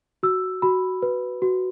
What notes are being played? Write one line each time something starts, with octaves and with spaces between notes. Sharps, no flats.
F#4 E6
F#4 B5
B4
F#4